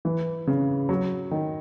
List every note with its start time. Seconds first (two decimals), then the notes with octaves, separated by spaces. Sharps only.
0.05 E3
0.47 C#3
0.89 F#3
1.31 D#3